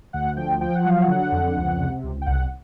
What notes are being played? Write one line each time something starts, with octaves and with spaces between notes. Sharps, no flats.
D2 F#5
F3 G5
F3 G5
F#5
F#3 F5
F#5
D3
F2
C#2
C3
C#2
G5
C2 F#5